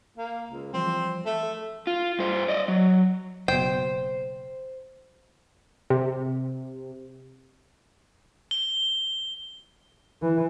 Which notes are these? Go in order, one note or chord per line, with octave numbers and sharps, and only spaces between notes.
A#3
C#2
E3 F3 G3 C4
A3
A4
F4
G2 C5
D5 D#5
F#3
F#1 B2 C5 G5
C3
G7
E3